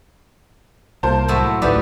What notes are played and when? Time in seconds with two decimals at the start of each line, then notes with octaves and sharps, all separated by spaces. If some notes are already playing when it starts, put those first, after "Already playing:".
1.03 C2 A#3 C5 A5
1.28 A2 F#3 E4
1.62 A1 D2 A2 A3 D#4 G4 B4 D5